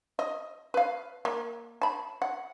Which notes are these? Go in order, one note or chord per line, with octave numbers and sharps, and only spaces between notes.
D#5
B4 F5
A#3
A5 B5
F#5